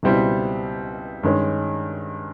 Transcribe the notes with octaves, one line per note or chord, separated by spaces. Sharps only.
C#2 B2 G3 C4 E4
G2 D#3 G#3 C#4